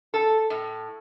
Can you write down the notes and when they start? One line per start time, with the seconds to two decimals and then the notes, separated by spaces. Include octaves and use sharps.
0.14 A4
0.50 A2